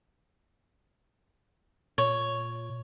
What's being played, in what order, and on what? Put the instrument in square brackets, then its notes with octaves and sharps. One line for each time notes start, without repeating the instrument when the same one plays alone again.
[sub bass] A#2 [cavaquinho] C#5